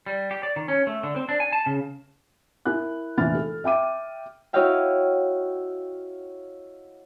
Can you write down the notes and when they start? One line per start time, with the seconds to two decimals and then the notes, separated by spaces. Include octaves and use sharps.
0.06 G3
0.31 G4
0.43 D5
0.56 D#3
0.68 C#4
0.87 A3
1.03 D3
1.16 C4
1.29 D4
1.40 G#5
1.53 A5
1.66 C#3
2.65 E4 A#4 G#5 F#6
3.17 F1 A#1 E3 F6 A6
3.35 A4
3.64 E5 G5 D6 D#7
4.53 E4 F#4 C#5 D#5 F5 G5